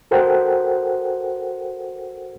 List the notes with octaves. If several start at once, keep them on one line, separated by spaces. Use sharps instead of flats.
F#4 A4 A#4 C5 F#5 G5